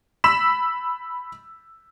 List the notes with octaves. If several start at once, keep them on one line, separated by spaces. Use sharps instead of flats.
B5 E6 B6 E7